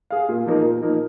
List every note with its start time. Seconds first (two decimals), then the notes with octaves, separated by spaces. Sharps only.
0.10 G#4 F5
0.29 A#2
0.46 F3 A#3 D#4 A#4
0.65 A#2
0.83 F3 A#3 D#4 A#4